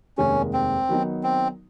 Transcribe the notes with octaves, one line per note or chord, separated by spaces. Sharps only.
F1 D#2 D#3 G#3 C#4
C4
D#3 F#3 B3 D#4
C4